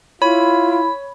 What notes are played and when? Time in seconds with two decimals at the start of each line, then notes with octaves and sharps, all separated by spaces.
0.22 E4 F4 C#5 B5